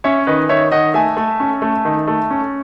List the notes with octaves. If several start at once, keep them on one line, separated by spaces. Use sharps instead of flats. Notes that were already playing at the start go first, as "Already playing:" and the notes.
C#4 C#5 E5
D#3 B4 D#5
D#3 C#5 E5
D#3 D#5 F#5
A3 E5 G#5
A3
C#4
A3
D#3
A3
C#4